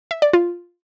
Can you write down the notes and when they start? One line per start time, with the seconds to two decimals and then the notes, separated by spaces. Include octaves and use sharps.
0.11 E5
0.22 D5
0.33 F4